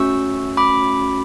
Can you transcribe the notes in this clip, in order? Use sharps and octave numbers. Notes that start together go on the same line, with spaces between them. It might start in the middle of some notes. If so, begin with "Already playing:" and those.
Already playing: A3 C#4 F#4 C#6 E6
B5 D6